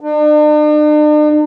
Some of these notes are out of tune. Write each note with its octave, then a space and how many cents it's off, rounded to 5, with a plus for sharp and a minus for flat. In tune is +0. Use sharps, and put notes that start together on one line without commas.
D4 +45